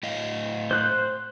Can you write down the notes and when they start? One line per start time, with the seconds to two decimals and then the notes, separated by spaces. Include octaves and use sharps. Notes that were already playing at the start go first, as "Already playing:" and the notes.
0.03 A2 D#5 F5
0.71 C5 F#6